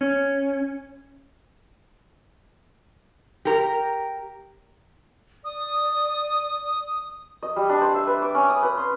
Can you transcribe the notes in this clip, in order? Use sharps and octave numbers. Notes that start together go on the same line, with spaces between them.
C#4
G4 A#4
D5 D#6
D#5
G3
D4
C5
E5
B4
D6
C#4
D#6
B4
C6